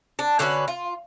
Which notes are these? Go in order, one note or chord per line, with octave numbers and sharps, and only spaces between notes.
D4
D3 C#4 F#4 B4
F4